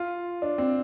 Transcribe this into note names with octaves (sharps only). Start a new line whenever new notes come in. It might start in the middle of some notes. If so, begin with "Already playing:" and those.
Already playing: F4
D4
C4